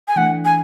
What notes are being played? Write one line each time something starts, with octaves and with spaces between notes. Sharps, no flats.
G#5
E3 A3 D4 F#5
G#5